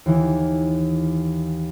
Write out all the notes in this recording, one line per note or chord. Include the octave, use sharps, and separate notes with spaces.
D#2 E3